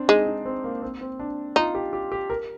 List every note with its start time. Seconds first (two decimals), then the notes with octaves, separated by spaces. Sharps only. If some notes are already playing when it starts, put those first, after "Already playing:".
Already playing: C4 D4
0.08 G#3 D#4
0.27 D#4
0.45 C4
0.64 A#3
0.82 C4
1.01 C4
1.19 D4
1.56 D#4 F4
1.75 G4
1.93 G4
2.12 G4
2.30 A#4